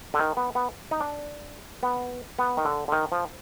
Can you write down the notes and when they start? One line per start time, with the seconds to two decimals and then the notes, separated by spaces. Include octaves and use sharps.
0.14 D3
0.20 D#3
0.37 B3
0.55 B3
0.91 D#4
1.00 D4
1.83 B3
2.39 B3
2.57 D#3
2.65 D3
2.88 D3
2.92 D#3
3.12 F3